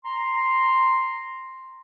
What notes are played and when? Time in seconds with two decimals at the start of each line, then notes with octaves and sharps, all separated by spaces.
0.05 A#5 C6